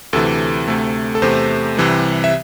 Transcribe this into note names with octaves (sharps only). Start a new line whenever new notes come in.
D2 C3 E3 A4
D2 C3 A3
A4
E2 C3 A3 C5
C2 C3 E3 G3
E5